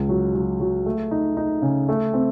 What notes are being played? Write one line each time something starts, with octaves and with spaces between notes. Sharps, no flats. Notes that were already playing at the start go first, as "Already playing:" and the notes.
Already playing: C#2
F#3
F#3
F#3
A3
D#4
D#4
C#3
A3
C4